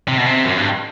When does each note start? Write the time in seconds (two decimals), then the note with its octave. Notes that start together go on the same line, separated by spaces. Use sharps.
0.08 C3
0.18 B2
0.26 C3
0.45 F#2
0.57 G2